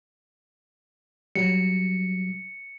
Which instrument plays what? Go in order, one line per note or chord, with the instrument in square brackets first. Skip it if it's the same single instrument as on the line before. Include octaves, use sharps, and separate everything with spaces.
[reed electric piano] F#3 G3 [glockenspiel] C#7